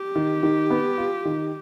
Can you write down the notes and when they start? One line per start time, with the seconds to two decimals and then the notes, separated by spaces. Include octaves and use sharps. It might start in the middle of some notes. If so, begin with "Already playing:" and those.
Already playing: G4
0.16 D#3
0.43 D#3
0.70 B3
0.97 F4
1.25 D#3